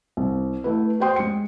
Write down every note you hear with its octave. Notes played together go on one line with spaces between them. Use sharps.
C2
A3 E4 B4
F#4 G4 C5 G5 C6 D#6
G#3 C#7